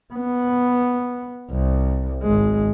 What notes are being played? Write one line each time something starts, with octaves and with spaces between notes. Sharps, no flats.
B3
C2
G#1 G#3